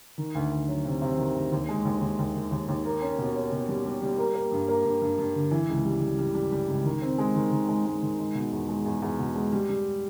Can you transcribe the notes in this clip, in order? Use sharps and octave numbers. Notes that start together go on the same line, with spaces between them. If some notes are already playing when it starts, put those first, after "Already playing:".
D#3
D2
D2
F#3
C3
C3
D#3
D2
D#2
G#3
D#2
D#2
D#2
D#3
D#2
D#2
A#3
C#4
B2
C#4
B2
G3
G3
G3
A#3
A#3
G2
A#3
G2
G2
G2
D3
E3
C#2
G3
G3
G3
G3
G3
C#2
D#3
C4
G#3
D#3
D#3
G#3
G#3
D#3
G#3
B2
E2
G#3
E2
E2
B2
G#3
G3
G3